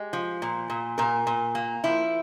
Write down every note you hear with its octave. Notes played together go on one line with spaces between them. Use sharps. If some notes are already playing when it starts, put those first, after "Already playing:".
Already playing: G#3 G4
F3
A#2
A#2
A#2 A#4
A#2
A#3
F3 E4